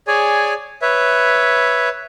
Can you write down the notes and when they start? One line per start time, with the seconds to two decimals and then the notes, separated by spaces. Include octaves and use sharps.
0.07 G#4 C#5 D5 G#5
0.82 B4 C#5 E5